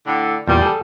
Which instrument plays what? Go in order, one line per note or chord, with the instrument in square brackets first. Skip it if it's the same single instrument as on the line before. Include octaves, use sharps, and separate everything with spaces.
[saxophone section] A2 D3
[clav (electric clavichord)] E2 A#2 [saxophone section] G3
[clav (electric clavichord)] G#4 A4